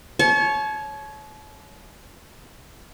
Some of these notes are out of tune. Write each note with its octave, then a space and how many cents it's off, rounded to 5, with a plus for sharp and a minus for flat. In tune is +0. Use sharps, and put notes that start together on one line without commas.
C#5 +0 A5 -40